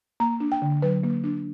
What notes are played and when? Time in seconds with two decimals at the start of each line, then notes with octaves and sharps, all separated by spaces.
0.20 A#3 A#5
0.40 D4
0.52 G5
0.62 D3
0.82 F#3 B4
1.03 A#3
1.24 D4